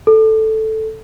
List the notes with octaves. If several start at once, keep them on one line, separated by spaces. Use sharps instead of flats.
A4